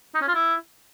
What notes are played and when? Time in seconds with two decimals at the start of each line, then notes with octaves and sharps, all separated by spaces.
0.15 D#4
0.21 C#4
0.28 F4
0.35 E4